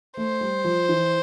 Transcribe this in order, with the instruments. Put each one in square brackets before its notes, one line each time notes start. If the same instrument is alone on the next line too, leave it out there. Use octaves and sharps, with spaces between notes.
[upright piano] A3 [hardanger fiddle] C5
[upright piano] G3
F3
E3